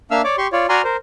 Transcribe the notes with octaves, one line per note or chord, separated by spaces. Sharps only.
A#3 D4 E5 F5 E6 F6
C#5 D5 D6
G4 C6 C#6
F4 C#5 D5
F#4 D5 G#5 A#5 C6 F6
A#4 C5